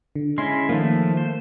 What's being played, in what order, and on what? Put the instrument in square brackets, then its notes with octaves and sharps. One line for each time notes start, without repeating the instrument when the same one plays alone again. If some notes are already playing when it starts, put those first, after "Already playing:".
[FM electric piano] D3
[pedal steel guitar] G#3 C#4 E4 [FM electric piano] C6
[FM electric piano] D#3 A#3 [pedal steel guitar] F3 A3
[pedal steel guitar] C5